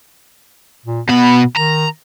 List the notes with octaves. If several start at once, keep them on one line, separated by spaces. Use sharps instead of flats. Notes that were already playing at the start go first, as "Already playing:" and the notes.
A#2
B2 B3 B5
D#3 A#5